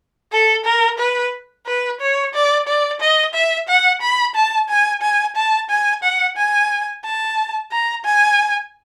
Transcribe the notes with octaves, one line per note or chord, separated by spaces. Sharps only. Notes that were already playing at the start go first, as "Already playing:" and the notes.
A4
A#4
B4
B4
C#5
D5
D5
D#5
E5
F#5
B5
A5
G#5
G#5
A5
G#5
F#5
G#5
A5
A#5
G#5